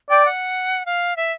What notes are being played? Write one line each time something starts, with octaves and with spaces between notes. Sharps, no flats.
D5 G5
F#5
F5
E5